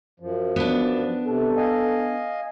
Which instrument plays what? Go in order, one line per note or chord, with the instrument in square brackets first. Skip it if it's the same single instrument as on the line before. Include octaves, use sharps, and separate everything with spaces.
[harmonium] F#2 F3
[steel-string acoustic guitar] B3 D4
[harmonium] C3 [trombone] A4
[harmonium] D#5 F5 G#5